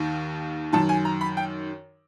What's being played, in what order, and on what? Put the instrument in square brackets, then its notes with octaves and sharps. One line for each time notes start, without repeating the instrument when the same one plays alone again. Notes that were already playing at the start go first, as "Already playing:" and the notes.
Already playing: [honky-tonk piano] D#2 D#3
F#2 D#3 A5
G#5
A#5
B5
G5